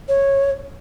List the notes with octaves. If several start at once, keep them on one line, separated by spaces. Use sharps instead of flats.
C#5